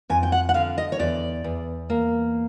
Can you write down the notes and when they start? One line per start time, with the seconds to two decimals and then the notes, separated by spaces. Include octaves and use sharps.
0.10 F2 G#5
0.23 G5
0.32 F#5
0.49 F#5
0.54 D3 F5
0.78 D#5
0.92 C#5
0.99 E2 D5
1.44 E2
1.90 A#3